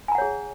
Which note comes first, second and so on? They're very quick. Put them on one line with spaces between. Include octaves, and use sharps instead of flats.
G#5 A#5 F#5 C#5 G#4